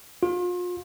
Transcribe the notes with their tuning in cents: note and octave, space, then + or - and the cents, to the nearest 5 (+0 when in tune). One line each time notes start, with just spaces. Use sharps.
F4 +35